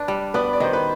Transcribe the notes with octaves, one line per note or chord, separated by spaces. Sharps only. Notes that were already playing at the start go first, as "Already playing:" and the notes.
Already playing: D4 B4
G3
B3 B4 D5
D5
D#3 C5
B4